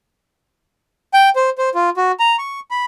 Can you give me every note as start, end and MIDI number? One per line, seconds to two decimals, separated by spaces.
1.14 1.29 79
1.36 1.50 72
1.58 1.69 72
1.75 1.90 65
1.97 2.12 66
2.20 2.36 82
2.39 2.60 85
2.71 2.85 83